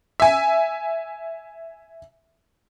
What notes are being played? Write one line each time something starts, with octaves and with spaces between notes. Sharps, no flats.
E5 G#5